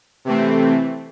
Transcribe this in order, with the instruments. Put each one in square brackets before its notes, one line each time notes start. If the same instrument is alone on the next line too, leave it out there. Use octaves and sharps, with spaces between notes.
[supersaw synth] C3 E3 A3 C4